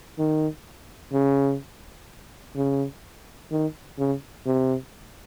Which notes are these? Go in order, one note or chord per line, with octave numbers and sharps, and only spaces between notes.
D#3
C#3
C#3
D#3
C#3
C3